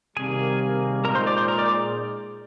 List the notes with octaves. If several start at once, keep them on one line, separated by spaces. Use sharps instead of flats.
C3 D#3 G3 A#3 G#4 G#5
A#2 G#3 D#4 A#4 A#5
C5 C6
D5 D6
C5 C6
A#4 A#5
D5 D6